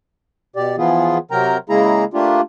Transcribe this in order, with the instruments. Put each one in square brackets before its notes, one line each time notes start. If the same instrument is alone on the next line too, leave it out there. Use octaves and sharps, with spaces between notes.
[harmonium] B2 G4 D5
E3 F3 B3 F4 G#4
C3 F#3 A#4 G5 A#5
C#3 G#3 A#3 E4 G#4 A#5
A3 A#3 D4 F4 G4